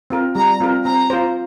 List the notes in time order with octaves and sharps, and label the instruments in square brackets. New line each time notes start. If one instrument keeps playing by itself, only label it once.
[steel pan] C4 F4 A#4
[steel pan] G3 [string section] A#5
[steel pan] C4 F4 A#4
[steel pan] C4 [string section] A#5
[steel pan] F4 C5